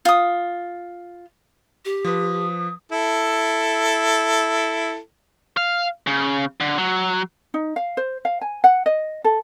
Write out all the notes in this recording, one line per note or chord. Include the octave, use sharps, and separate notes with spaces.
F4 D#6
G4
F3 B4 D#6
E4 A4
F5
C#3
D3
F#3
D#4
F5
C5
F5
G#5
F#5
D#5
A4